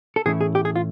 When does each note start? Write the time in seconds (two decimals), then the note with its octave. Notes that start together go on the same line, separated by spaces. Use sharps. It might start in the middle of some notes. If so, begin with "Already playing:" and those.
0.16 A4
0.26 A2 E3 A3 C#4 E4 G#4
0.41 G#4
0.55 G4
0.65 G#4
0.76 F4